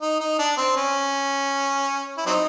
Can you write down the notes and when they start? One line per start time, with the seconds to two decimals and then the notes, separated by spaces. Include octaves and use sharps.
0.01 D#4
0.21 D#4
0.39 D4
0.57 C4
0.77 C#4
2.18 E4
2.26 F#3 C4 D#4